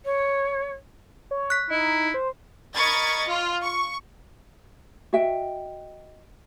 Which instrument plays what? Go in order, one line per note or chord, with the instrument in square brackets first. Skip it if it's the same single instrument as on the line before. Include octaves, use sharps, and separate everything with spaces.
[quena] C#5
[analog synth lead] C#5
[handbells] F#6 B6
[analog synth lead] D#4 [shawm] E4
[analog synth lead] C5
[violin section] A#4 D#5 B5 C#6 G#6 A6
F4
C#6
[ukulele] F#4 D#5 E5 G5